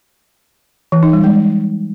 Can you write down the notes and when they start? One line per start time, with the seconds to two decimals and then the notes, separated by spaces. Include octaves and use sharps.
0.92 E3
1.03 D#4
1.13 G3
1.24 G#3